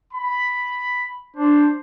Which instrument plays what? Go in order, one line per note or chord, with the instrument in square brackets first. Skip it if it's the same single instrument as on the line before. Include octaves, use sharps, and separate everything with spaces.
[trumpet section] B5
[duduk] D4 [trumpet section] C5